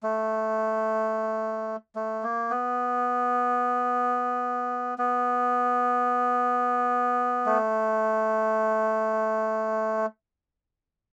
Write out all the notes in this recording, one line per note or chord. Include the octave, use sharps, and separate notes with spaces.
A3
A3
A#3
B3
B3
A3